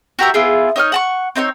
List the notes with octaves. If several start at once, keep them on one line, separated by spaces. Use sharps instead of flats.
F#4 G4 A#4 E5
B3 E4 F4 G#4
D#4 C#5 D#5 F6
F#5 A5 C#6
C4 D#4 C5 C#5